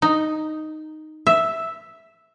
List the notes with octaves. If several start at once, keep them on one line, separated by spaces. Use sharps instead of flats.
D#4
E5